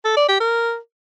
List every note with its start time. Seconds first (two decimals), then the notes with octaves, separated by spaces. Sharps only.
0.05 A4
0.17 D5
0.28 G4
0.40 A#4